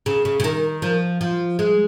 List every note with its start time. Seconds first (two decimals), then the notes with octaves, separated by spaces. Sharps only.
0.06 C#3
0.25 C#3
0.40 C#3
0.44 D#3
0.82 F3
1.21 F3
1.59 G#3